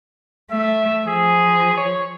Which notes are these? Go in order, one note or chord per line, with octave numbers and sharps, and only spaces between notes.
A3 E5
F3 G#4
C#5